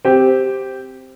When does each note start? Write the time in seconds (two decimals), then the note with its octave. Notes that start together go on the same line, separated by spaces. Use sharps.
0.05 C4 G4